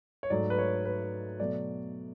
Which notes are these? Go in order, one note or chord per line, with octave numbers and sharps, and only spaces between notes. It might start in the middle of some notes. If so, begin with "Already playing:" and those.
C#5
G#2 F#3 A3 D5
B4
C#5
B4
B2 F#3 A3 D5